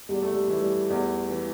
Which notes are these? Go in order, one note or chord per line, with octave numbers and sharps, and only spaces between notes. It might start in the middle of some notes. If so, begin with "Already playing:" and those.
E2 G3
A3
G3
E3 A3
G3
E2
E3